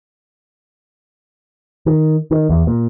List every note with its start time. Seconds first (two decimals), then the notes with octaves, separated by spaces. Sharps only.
1.86 D#3
2.31 D#3
2.49 E2
2.67 A#2